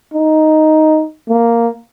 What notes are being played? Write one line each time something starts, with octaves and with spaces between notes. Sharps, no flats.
D#4
A#3